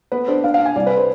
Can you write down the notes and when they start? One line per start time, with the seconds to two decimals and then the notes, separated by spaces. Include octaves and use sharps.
0.12 B3 B4
0.28 D4 C5
0.44 D4 F5
0.54 F5
0.60 D4
0.66 G#5
0.76 C2 D5
0.87 B4
0.97 C5